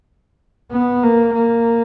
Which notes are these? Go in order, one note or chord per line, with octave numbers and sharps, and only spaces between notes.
B3
A#3
A#3